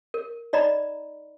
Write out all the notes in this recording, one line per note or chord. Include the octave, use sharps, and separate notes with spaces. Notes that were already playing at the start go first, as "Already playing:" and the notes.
A#4
D#4 D5 D#5 A#5 B5